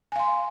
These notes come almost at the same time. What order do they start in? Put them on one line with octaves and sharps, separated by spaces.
G#5 F5 C6